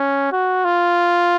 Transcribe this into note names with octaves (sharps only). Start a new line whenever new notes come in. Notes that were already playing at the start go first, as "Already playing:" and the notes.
Already playing: C#4
F#4
F4